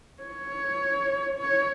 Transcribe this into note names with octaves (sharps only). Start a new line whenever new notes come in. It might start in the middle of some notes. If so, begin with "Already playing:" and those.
C#5
C#5